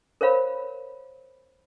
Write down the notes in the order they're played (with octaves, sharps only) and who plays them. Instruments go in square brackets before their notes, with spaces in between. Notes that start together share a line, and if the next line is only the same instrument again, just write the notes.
[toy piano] A#4 C5 C#5 F5 B5